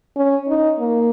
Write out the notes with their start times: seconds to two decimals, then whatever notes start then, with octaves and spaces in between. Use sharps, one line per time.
0.17 C#4
0.49 D#4
0.79 A#3